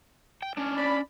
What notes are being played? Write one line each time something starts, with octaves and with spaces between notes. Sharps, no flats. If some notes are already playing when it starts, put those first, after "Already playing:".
G5
C#4 D4
D5 B5